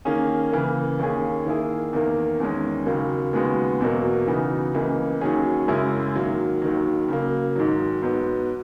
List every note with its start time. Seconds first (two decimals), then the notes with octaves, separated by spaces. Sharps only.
0.05 D#3 A#3 C#4 G#4
0.52 C#3 E3 A#3
0.99 D#2 D#3 A#3 C#4 G#4
1.46 D#3 A#3 E4 G#4
1.93 E2 D#3 A#3
2.40 E2 D#3 G#3 C#4
2.86 D#2 C#3 F#3 A#3
3.33 D#2 C#3 G#3 B3 F#4
3.81 E2 B2 F#3 A#3
4.27 C#3 E3 B3 D#4 F#4
4.74 C#2 C#3 E3 A#3
5.21 D#2 D#3 F#3 C#4 G#4
5.68 F#2 C#3 G#3 C#4 E4
6.15 G#2 D#3 F#3 A#3
6.62 D#2 D#3 F#3
7.08 C#3 F#3 A#3
7.56 G#2 D#3 F#3
8.02 G#2 F#3 B3